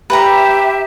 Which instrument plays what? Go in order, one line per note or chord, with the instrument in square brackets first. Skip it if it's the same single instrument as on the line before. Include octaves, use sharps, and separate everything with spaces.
[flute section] G4 E5 [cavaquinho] B4 G5 A#5